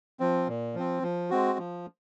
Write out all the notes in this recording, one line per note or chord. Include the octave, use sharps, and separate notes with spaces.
F3 C4
A#2
F3 C4
F3
G#3 C4 F#4
F3